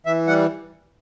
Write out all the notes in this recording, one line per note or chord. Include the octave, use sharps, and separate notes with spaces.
E3 E5
G3 F#5